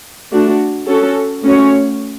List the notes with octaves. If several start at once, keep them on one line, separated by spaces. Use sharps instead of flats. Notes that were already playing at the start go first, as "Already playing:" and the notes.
A3 D4 F#4
C#4 F#4 A4
A3 C#4 F#4 C#5